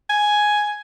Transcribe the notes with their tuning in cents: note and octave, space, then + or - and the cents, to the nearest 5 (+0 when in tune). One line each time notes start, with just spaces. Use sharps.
G#5 +5